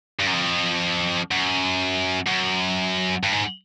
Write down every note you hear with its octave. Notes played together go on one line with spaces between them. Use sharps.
G2
F#2
F2
F#2
F#2
G2
G#2